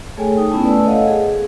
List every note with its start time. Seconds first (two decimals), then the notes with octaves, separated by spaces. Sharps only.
0.17 A3 G#4 A4 C#5 G5 G#5
0.37 D#4 G5 D#6
0.51 B3 C#4 E4 A5
0.63 A3 B4 D5 G#5 A5 E6
0.84 A4 C#5 D#5 F5 F#5
1.08 G#4